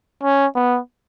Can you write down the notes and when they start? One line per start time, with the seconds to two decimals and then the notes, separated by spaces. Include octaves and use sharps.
0.23 C#4
0.56 B3